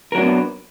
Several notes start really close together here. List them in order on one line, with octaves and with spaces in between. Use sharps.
A#4 F#3 D4 A#3 B3